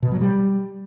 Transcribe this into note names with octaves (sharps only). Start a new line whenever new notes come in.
B2
F#3
G3